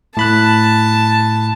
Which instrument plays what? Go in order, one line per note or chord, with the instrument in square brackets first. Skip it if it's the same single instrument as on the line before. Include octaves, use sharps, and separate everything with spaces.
[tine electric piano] A2 B5 F#6 [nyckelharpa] A5